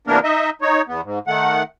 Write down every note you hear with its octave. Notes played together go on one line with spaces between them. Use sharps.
C3 E3 A#3 B3 D4 A#4
D#4 D#5 E5
D#4 C#5
E2 B3
G#2
D#3 A3 F#5